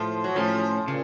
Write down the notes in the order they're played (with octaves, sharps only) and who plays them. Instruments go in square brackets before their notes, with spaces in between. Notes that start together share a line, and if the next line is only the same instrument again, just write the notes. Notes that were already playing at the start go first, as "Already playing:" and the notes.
Already playing: [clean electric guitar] A2 A3 A4 C5 [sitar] F3
[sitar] F#3
[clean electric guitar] A2 A3 C#4 A4 C5 [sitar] F3
[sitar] A#2 [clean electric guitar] C#3